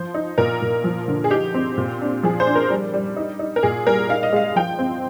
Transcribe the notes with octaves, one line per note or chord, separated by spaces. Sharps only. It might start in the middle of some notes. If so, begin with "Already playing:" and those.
Already playing: F3 C5
D#4
A#2 A#4
A#2
F3
D3
G#4
D#4 G4
C4
A#2
D4
F3 G#4
C5
D4
A#4
G3
G3
D#4
D#4
A#4
A#2 G#4
G3 A#4
D#4 F5
D#5
G#3 F5
F3 G5
C4